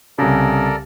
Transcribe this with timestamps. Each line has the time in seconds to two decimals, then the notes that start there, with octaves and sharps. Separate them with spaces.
0.18 C2 C#3 A4 A#4 D5